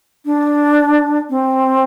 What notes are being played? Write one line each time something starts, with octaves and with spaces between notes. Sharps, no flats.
D4
C4